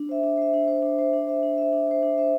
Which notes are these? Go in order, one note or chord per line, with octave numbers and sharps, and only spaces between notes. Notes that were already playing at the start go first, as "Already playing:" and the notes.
Already playing: D4
C5 E5
D4
C5 E5
D4
C5 E5
D4
C5 E5
D4
C5 E5
D4
C5 E5
D4
C5 E5
D4
C5 E5